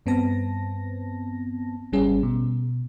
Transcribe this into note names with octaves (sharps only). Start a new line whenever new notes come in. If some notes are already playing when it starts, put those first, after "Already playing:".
G2 B3 C4 A5 A#6
G#1 G3 C#4 G#4
B2